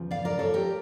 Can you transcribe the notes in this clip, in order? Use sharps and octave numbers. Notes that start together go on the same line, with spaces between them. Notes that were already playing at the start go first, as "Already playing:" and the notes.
Already playing: E2 C#3 F3
D5 F5
A#4 D5
A4 C#5
G4 A#4